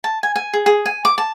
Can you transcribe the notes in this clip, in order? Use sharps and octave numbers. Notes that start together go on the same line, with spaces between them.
A5
G#5
G#5
G#4
G#4
G#5
D6
A5